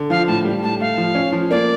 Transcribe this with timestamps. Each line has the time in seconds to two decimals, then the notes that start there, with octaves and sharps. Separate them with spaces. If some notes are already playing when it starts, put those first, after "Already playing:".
Already playing: D3
0.10 F3 F5
0.27 A2 A5
0.45 G3
0.63 A2 A5
0.80 A3 F5
0.98 F3
1.15 C#4
1.32 F3
1.51 A#3 D5